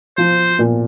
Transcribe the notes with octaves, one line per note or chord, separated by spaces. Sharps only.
F3 C5
A#2